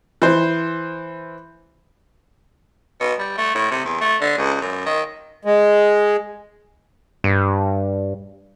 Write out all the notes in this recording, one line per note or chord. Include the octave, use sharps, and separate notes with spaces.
E3 C5
B2
G3
A3
A2
C3
E2
A3
D3
C#2
F#2
D#3
G#3
G2